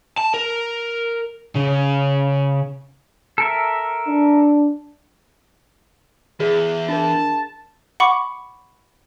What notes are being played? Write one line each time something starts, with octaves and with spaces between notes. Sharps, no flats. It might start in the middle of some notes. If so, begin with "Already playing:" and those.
A5
A#4
C#3
A4 A#4 E5
D4
E2 G#4
D4 A#4 A5
F#5 B5 C#6 D6